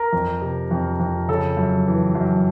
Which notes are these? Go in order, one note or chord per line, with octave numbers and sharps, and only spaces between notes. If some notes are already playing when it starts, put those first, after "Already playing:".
Already playing: A#4
F2
C3
F2
F2
C#3 A4
F#2
E3
F#2